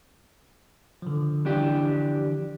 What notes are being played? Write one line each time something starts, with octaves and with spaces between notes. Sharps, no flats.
D3 F3
E3 D4 G4